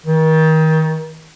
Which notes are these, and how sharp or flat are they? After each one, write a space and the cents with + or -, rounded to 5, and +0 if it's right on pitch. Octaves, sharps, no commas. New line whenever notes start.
D#3 +30